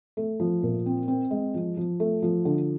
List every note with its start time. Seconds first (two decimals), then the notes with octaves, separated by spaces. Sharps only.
0.17 A3
0.40 F3
0.63 A#2
0.86 C4
1.08 C4
1.31 G#3
1.54 F3
1.77 F3
2.00 A3
2.22 F3
2.45 D3